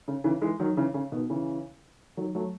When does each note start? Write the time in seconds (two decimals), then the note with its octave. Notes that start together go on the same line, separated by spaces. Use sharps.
0.08 C#3
0.24 C#3 E3
0.42 E3 G#3
0.60 D#3 F#3
0.77 C#3 E3
0.94 C#3
1.12 B2 D#3
1.30 C#3 E3
2.17 D#3 F#3
2.35 F#3 A3